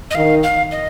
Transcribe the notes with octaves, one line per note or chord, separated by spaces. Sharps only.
D#5
D#3 F5
F5
D#5